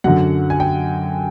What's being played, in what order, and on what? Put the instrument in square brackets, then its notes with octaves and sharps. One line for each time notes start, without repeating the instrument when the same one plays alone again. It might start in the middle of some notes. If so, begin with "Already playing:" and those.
[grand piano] F#2 D3 F#3 F#5
G#5
G5